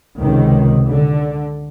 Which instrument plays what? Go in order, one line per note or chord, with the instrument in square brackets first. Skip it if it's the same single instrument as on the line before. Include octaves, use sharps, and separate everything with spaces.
[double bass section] C#2 C3 D#3
D3